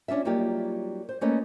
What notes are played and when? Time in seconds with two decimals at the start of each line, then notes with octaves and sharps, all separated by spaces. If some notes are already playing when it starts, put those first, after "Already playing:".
0.08 C#4 D4 F4 E5
0.25 F#3 G3 A#3 D#4 F4 G4
1.09 C5
1.21 A3 A#3 C#4 B4 D#5